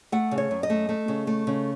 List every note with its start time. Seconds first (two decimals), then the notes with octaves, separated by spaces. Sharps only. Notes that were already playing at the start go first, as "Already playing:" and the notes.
0.12 A3 F#5
0.31 C#3
0.38 C#5
0.51 F#2
0.63 D#5
0.70 A3
0.89 A3
1.08 C#3
1.27 A3
1.47 C#3